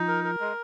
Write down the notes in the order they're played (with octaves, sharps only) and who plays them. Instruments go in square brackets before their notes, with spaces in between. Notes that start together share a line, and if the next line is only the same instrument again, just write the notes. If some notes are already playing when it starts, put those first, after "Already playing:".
Already playing: [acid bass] F3 [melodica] D#4
[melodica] A#4
A#4
G#3